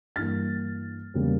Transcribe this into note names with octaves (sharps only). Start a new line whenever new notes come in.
G2 E3 A#3 F6 A6
E1 C#3 G3 A#3